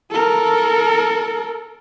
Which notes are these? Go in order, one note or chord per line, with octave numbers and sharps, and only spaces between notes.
A4 A#4